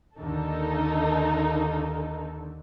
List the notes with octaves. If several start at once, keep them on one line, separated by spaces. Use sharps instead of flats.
D#2 D3 A#3 D#4 A4